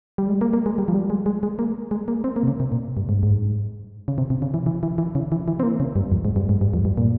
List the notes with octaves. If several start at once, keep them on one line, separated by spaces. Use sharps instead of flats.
G3
G#3
A#3
A#3
G#3
G3
F3
G3
G#3
G#3
G#3
A#3
G#3
A#3
C4
A#3
C3
C#3
C3
A#2
G2
G#2
G2
G#2
C#3
C3
C3
C#3
E3
E3
E3
E3
C#3
E3
E3
C4
A#3
C#3
G2
F2
G#2
G2
G#2
G2
F2
G2
A#2